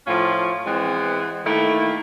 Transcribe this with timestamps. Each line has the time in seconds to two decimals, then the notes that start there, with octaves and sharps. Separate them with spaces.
0.07 A2 F3 C#4 F4
0.66 E3 G#3 B3 C4
1.46 D#3 A3 A#3 E4